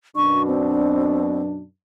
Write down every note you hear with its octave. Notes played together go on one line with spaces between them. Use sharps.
F#2 B2 D4 C#6
C4